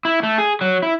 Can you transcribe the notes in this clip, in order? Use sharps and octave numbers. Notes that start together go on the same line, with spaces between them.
E4
A3
G#4
F#3
E4